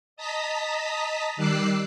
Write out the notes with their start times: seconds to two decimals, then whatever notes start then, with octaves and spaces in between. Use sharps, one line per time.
0.17 D#5 A5 A#5 D#6 B6
1.36 D#3 G3 D6 E6 F#6 C7